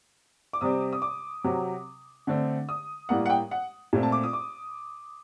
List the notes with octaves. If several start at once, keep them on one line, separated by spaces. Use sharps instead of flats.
D6
C3 G3 C4 D#6
D#6
D6
C3 F#3 C4
D3 A3 C4
D#6
A2 G3 A#3 F#5
F#5
G5
F#5
A#2 A3 C4
A5
D6
D#6
D6